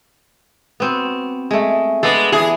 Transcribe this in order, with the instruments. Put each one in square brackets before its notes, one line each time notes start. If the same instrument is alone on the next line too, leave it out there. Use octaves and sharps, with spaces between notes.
[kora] B3 C4 F#4
G#3 A3
[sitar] G#3 [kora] B3 D4 A4
[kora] E3 [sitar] G#4